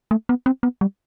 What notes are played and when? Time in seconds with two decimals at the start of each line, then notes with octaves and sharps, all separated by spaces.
0.11 A3
0.29 B3
0.46 C4
0.63 B3
0.81 G3